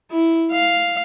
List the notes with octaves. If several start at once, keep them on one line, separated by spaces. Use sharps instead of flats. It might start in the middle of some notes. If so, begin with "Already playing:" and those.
E4
F5